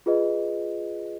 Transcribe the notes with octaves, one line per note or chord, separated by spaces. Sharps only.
F4 G#4 B4 D#5